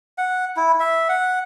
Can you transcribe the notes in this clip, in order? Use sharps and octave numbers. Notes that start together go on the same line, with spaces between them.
F#5
E4
E5
F#5